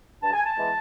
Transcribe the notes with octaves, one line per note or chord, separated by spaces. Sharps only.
G2 A5
G#5
A5
E3 G#3 B3